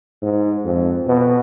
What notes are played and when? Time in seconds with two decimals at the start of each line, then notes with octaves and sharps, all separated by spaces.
0.23 G#2
0.65 F2
1.07 B2